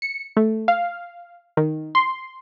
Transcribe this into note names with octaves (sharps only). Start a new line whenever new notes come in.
C#7
A3
F5
D#3
C6